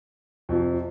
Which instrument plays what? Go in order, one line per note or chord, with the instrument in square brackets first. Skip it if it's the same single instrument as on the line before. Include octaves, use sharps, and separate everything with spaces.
[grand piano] F2 C3 F3